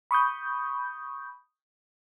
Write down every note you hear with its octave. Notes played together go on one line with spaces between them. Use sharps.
B5 C#6 D#6 G6